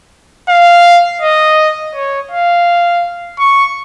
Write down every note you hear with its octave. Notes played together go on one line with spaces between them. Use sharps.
F5
D#5
C#5
F5
C#6